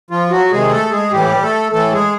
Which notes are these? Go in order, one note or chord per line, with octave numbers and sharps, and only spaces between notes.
F3 F4
F#3 F#4
C3 D#3 G#3 G#4
A3 A4
G#3 G#4
A2 E3 G3 G4
A3 A4
A2 E3 A3 A4
G#3 G#4